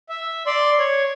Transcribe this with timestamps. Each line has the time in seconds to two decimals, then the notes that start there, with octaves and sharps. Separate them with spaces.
0.09 E5
0.46 D5 C6
0.79 C#5